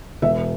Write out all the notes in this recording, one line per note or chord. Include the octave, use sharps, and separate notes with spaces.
E1 E5